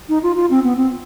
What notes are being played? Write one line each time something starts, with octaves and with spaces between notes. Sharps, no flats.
D#4
F4
F4
C4
B3
C4